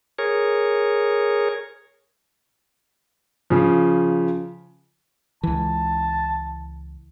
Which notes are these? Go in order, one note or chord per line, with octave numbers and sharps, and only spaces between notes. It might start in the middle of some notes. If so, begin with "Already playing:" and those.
G#4 A#4 C#5
C#3 F3
C#2 E3 A5